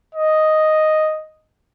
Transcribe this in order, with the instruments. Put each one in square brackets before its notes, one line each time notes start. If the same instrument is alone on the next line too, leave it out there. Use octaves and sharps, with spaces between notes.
[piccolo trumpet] D#5